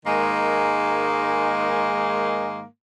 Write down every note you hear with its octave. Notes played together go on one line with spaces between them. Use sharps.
G#2 D#3 G#3 A#3